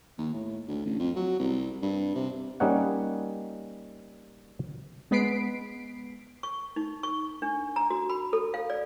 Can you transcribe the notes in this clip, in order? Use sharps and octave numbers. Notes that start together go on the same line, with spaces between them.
D#2
A2
D2
A1
F2
F#3
C2
G2
C3
G3 A#3 C#4 D#4 C#5 F#5
G#3 B3 B4 B6 C7 D7
C#6
D#4
C#6
D4
A#5
F#4
B5
A4
F5
D5